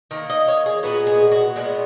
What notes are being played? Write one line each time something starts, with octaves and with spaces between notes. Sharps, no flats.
D#3 A#3
D#5
C#5
G#4
A#2 G#3 B3 F#4
G#4
F#4
A#2 G#3 B3